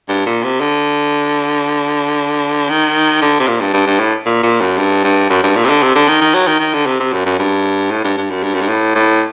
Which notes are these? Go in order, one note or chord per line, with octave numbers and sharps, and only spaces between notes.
G2
A#2
C3
D3
D#3
D3
C3
A#2
G2
G2
G2
A2
A#2
A#2
F#2
G2
G2
F#2
G2
A#2
C3
D3
C3
D3
D#3
D#3
F#3
D#3
D#3
D3
C3
C3
F#2
F#2
G2
A2
G2
G2
F#2
G2
F#2
G2
A2
A2